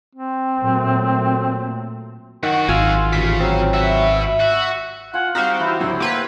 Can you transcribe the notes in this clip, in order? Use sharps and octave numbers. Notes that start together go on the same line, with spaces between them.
C4
A#2 F#3 A3
F#2 D#3 F#4 F#5
G#1 F4 G#5 E6 F6
A1 C#3 B6
F#3 C4
F#4 B4 E5
F#4 F#6
F4 F#5 G#5
G3 C4 D#4 F#4 G4 C5 F5
E3 C4 E4 C#6 E6
G#1 D2 F#3
A#3 G4 B4 C5 E5 F#5 C6 G#6